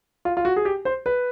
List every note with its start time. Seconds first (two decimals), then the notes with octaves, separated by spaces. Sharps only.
0.25 F4
0.37 F4
0.45 F#4
0.56 G#4
0.65 G4
0.85 C5
1.06 B4